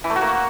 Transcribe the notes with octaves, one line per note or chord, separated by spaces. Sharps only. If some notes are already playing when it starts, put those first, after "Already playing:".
E3
A3
F#4
A#3